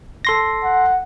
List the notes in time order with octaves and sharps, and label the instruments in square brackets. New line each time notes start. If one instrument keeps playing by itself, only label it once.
[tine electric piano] A4 C6 A#6
[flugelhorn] F#5